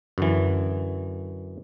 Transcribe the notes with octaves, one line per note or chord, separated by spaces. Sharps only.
F#2 D3 E3